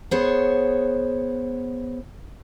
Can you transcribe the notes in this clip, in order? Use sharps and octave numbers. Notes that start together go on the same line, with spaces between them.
B3 G#4 C5 C#5